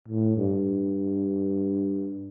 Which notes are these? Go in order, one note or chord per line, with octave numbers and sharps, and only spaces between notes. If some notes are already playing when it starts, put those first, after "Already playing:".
A2
G2